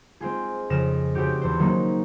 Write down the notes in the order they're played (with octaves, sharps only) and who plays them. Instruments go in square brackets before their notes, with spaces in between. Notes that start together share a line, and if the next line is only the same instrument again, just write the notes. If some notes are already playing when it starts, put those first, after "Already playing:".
[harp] G#3 C4 F4 G#4
F2 C#3 F6 A#6 D#7 E7
C#3 C4 F#4 G4
E2 C5
D#3 F#3 A#3 C#4 D#4